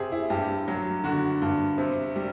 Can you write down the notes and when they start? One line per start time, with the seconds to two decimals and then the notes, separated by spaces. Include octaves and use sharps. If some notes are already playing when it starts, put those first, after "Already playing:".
Already playing: C3 G4 G#4
0.12 E4
0.30 G2 G4
0.68 F#3
1.04 D3 F#4
1.42 G2
1.78 C3
2.16 G3